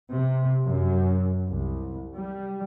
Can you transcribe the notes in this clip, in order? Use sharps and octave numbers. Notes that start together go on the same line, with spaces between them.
C3
F#2
C2
G3